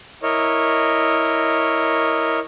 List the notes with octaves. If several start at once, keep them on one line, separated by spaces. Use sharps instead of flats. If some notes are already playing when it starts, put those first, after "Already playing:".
E4 A#4 C#5 D#5